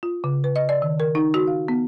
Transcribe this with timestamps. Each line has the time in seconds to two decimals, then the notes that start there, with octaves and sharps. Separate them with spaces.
0.03 F4
0.24 C#3
0.44 B4
0.56 D#5
0.69 D5
0.82 D#3
1.00 A#4
1.15 D#4
1.34 F#4
1.47 F5
1.68 B3